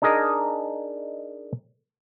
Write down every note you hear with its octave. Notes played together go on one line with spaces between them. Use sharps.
D4 D#4 G#4 A#4 D#5